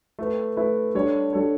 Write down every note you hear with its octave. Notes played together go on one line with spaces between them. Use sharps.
A3 E4 B4
A3 E4 B4
G3 D4 A4 C#5
G3 D4 A4 C#5